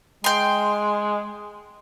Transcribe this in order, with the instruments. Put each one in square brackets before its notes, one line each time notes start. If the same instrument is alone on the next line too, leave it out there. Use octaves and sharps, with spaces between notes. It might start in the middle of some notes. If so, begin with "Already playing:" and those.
[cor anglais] G#3 [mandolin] G5 C6